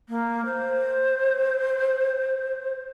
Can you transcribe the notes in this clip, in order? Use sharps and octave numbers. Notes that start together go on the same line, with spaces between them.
A#3
C5